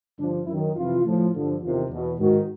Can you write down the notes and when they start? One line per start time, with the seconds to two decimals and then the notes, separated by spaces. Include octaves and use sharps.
0.19 G2 D3 F3 D4
0.47 F#2 E4
0.51 D#3
0.76 F2 C3 E3 F4
1.04 A2 F3
1.33 G2 D3 F3
1.61 E2 C3 D#3 F4
1.89 E2 B2
2.18 G#2 D#3 F#4